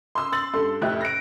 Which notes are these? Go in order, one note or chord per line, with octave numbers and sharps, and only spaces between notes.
C6 D#6 E6
C6 A6 F#7
G2 A4 C6
F1 A2 G4 D#5 E5 F#6
A#6 D7